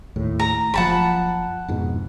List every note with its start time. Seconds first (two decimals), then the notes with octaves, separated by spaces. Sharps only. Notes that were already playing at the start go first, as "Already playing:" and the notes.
0.16 D#2 A2
0.39 A#5
0.74 F#1 F3 F#5 A5 B5
1.68 F2 G#2 B2